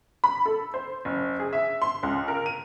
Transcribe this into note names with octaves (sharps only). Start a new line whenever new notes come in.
B5
A4
C5
F#1
G#4
E5
C6
C#2
A#4
D#7